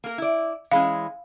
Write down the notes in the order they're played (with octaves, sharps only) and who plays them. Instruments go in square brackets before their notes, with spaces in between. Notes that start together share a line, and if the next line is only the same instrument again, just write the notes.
[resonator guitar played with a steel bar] A#3 A#4
E4 D5
[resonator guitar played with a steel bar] E3 G#3 C#4 [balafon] F5